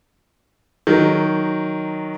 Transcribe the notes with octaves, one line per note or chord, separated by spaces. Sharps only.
D#3 F#3